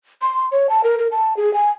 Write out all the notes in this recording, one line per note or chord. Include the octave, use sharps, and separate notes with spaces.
C6
C#5
A5
A#4
A#4
A5
G#4
G#5